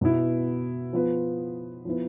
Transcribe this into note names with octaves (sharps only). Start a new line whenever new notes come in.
B2 B3 E4
F3 B3 F4 B4
F3 B3 E4 B4